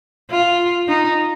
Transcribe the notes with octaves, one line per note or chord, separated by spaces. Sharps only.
F4
D#4